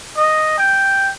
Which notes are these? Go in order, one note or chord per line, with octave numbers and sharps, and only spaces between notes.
D#5
G5